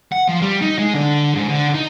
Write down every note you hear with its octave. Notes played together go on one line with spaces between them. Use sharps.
F#5
F3
G3
D#4
G#3
D3
G#2
D3
D#4